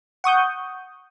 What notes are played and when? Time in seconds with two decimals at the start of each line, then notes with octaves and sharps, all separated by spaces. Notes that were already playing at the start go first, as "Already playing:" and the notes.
0.24 F#5 C#6 D#6 G6